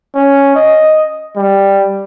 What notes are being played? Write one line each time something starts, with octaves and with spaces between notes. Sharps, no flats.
C#4
D#5
G3